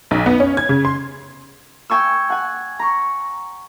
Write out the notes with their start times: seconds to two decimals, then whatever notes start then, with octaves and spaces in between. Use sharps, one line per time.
0.11 B1
0.26 B3
0.40 C#4
0.57 G#6
0.69 C#3
0.85 C6
1.90 G5 G#5 C#6 E6
2.30 F#5 G#5
2.79 A#5 C#6